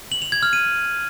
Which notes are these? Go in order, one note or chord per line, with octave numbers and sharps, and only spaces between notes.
F#7
F7
G#6
F6
D#7